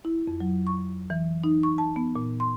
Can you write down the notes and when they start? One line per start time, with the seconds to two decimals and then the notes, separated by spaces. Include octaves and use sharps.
0.05 E4
0.27 F2
0.40 F#3
0.67 C#6
1.10 E3
1.44 D#4
1.63 C#6
1.78 A5
1.96 B3
2.16 A#2
2.40 C6